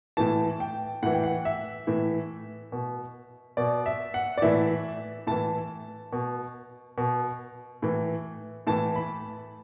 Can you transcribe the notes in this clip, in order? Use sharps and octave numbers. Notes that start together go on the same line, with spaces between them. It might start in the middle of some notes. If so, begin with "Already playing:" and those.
A2 E3 A5
G5
A2 E3 F#5
G5
F#5
E5
A2 E3
B2
B2 D5
E5
F#5
D5
A2 E3 E5
A2 E3 A5
B2
B2
A2 E3
A2 E3 A5
B5